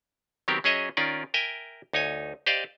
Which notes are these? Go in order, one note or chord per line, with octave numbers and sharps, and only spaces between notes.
D#3 F#3 B3 C4 G4 A#4
F#3 C#4 G#4 C#5 D#5 E5
D#3 C#4 F4 A#4 D5
A#4 E5 G5 G#5
D2 D#4 C#5 G#5
G4 C5 D5 D#5 F5